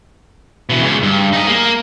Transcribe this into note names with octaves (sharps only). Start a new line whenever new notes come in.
B2 E3
C#2 C#3
G2
D#4 G#4
A#3 A#4